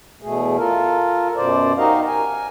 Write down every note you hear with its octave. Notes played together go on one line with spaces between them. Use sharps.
E2 B2 A3 G#4
F4 A4 A#4
F#2 B2 C5 D5
D#4 F#4 G4 A#4 D#5 F5
A#4 G#5